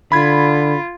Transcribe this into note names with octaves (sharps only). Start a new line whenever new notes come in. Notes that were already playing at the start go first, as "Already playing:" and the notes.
D3 F4 B5 G#6